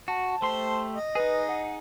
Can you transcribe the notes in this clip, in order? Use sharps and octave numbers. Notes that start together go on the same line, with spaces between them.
F#4 A5
A3 G4 C5 C6
D#5
D#4 G#4 B4
F#5